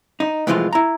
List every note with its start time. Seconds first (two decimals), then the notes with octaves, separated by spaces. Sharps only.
0.20 D#4
0.47 C2 A2 E3 F3 G#3 F4
0.72 E4 A#5